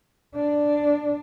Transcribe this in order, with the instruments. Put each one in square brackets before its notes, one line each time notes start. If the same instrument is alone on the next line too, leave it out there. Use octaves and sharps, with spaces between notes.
[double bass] D4